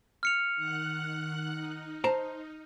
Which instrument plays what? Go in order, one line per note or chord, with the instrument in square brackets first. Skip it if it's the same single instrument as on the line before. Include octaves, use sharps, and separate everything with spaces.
[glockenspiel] F6 C#7 F7
[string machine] D#3 F#5 F#6
D#4
[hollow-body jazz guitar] C5 A5 A#5